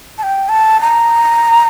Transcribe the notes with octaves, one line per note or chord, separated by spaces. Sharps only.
A5
G5
A5
A#5